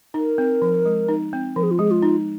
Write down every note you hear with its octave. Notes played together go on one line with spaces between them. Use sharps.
D#4 A#4
C4
F3
G#3
D#4
C4
F3 A#4
G#4
F4
G#3 G#4
F4
D#4